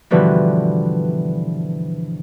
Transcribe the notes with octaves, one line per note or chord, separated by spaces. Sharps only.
G2 B2 D3 E3 F3